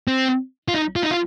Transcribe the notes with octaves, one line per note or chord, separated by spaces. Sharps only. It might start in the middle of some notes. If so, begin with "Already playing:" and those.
C4
F4
D#4
F4
D#4
F4